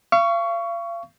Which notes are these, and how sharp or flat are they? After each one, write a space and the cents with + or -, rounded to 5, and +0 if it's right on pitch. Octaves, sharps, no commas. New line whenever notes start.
F5 -35 C#6 +15